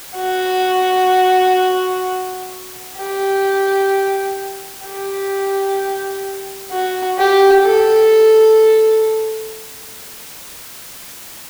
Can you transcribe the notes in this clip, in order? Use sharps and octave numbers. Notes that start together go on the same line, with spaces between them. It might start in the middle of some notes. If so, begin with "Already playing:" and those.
F#4
G4
G4
F#4
G4
A4